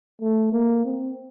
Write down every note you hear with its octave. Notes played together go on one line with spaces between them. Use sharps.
A3
A#3
C4